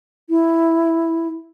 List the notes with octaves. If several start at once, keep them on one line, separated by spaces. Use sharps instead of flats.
E4